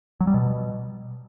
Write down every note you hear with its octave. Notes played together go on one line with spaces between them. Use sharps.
F#3
G3
B2